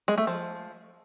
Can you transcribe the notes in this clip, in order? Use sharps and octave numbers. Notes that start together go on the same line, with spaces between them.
G#3
A3
F3